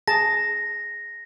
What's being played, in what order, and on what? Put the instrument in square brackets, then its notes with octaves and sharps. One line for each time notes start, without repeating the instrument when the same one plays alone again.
[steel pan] G#4 A5 [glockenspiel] A#6